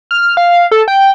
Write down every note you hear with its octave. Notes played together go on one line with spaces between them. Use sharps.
F6
F5
A4
G5